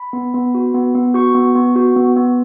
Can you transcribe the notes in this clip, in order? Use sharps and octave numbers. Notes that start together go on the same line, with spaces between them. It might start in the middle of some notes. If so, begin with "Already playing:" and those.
Already playing: B5
B3
B3
F#4
B3
B3
F#4 C#6
B3
B3
F#4
B3
B3